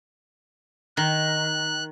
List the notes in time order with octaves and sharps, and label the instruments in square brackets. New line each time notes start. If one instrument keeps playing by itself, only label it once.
[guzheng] D#3 [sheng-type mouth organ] F#6